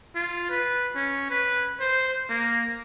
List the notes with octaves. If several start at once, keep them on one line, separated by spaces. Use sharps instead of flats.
F4
B4
C#4
B4
C5
A#3